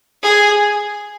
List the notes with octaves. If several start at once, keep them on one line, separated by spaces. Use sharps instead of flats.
G#4